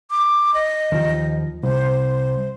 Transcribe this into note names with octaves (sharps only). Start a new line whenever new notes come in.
D6
D#5
D#2 F3
C2 C5